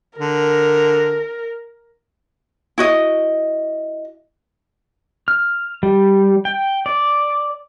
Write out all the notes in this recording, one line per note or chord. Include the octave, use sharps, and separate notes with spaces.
D3 A#4
E4 F#4 D#5
F6
G3
G5
D5